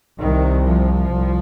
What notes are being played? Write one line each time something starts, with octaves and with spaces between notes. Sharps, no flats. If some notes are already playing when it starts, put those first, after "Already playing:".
C2 C3 D#3
F3
C2